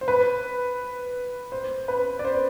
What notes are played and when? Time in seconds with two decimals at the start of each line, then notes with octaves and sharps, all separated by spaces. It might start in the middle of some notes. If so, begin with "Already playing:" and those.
0.01 C5
0.08 B4
1.52 C5
1.88 B4
2.19 D5
2.25 C5